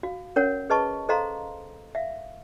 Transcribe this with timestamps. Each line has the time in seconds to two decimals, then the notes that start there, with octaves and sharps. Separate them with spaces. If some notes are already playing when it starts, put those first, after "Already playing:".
0.03 F#4 F5
0.36 C#4 A#4 C#5 F#5
0.70 G#4 B4 D#5 A5 C#6
1.09 A4 C5 D#5 F5 A#5 C6
1.95 E5 F5